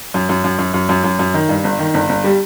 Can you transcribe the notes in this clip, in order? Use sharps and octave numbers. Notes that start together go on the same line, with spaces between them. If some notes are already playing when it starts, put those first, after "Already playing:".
F#2
F#2
F#2
F#2
F#2
F#2
F#2
F#2
D#3
G2
G1
D#3
G1
G1
G3